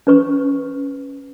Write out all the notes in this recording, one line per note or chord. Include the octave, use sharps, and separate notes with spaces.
C#4 B4 C#6